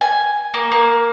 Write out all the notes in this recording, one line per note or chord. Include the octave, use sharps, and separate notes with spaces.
G#5
A#3
A#3